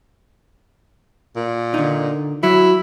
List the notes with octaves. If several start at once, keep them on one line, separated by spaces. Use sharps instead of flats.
A#2
D3 D#4
F#3 E4